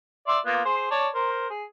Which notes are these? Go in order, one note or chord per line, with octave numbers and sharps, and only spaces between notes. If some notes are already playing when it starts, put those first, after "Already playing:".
D5 E5 C6
A#3 B3 F4
G#4 C5
C#5 D5 A5
A#4 C5
G#4